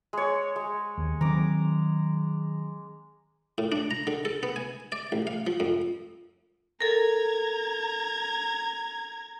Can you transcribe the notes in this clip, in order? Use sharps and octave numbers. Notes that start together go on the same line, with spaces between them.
G#3 C#5
G#3
D#2
D#3 F#3 C4 A#5 D6
A2
D4
A#5
D3
A4
B3
G#5
D5
A1
F5
F3
F2
A4 A#4 A#5 G#6